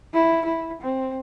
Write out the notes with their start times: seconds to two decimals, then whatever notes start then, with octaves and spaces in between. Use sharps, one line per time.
0.14 E4
0.45 E4
0.82 C4